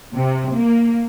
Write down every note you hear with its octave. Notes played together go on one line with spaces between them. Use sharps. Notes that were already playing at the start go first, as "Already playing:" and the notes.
C3
A#3